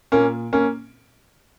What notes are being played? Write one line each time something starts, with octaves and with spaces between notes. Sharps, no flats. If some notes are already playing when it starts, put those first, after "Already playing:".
A#2 A#3 C#4
A#3 C#4